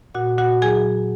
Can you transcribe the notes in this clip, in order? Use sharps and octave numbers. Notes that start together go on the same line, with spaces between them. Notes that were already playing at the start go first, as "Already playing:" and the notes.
A#2 F#4 F#5
A#2 F#4 F#5
F#3 G#4 G#5